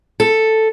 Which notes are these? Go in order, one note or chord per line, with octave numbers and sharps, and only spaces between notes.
A4